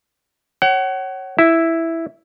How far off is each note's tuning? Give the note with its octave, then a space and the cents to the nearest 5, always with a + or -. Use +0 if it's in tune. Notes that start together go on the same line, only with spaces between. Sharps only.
C#5 -15 F#5 +35
E4 +0 E5 +0